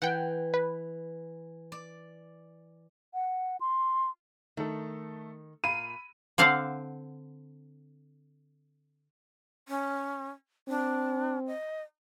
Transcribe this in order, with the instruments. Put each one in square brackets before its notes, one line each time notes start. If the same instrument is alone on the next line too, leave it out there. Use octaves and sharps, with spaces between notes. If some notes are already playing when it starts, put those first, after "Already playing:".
[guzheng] E3 [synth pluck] F#5 G5
[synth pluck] B4
[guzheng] D5
[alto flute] F#5
C6
[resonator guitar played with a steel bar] D#3 [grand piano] A3 A4
[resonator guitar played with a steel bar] A#2 F5 [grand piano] B5 [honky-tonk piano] D#7
[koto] D3 C4 F5 F#5
[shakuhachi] C#4
[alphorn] C4 [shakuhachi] D4
[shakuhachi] D#5